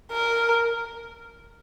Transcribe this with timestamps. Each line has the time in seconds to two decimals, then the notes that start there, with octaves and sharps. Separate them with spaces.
0.12 A#4